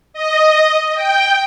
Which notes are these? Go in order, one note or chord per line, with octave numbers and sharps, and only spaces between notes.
D#5
G5